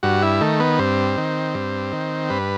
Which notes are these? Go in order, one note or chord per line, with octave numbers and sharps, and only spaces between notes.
G2 F#4
E4
D#3 A3
B3
G2 C4
D#3
G2
D#3
G2 B4